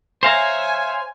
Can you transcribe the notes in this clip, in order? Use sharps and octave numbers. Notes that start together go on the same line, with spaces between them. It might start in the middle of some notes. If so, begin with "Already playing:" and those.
C5 C#5 E5 F5 G#5 A#5